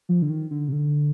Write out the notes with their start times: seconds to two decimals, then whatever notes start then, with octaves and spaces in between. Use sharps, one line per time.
0.09 F3
0.22 D3
0.30 D#3
0.51 D3
0.68 C3
0.72 D3